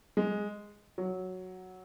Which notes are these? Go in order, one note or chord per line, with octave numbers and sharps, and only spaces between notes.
G#3
F#3